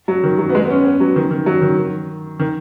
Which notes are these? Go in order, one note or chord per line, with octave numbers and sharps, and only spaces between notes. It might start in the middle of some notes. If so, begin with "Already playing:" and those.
F#3
D#3
F#3
B3
G#3
B3
C#4
B3
F#3
D#3
D#3
F#3
D#3
D#3
D#3